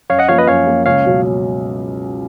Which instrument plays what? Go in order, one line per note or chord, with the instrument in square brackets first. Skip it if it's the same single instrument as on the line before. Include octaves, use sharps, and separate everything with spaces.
[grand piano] F#2 [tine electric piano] C#5 F5
[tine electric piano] D#5 F#5
[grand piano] F3 A#3 [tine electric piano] C#5 F5
[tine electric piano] B4 D#5
[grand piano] F#2 [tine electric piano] C#5 F5
[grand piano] F3 A#3
[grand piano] C#2 [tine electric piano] C#5 F5
[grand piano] B2 F#3 C#4